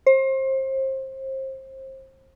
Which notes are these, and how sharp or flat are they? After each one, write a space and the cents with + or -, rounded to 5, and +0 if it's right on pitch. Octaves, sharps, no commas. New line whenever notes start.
C5 +30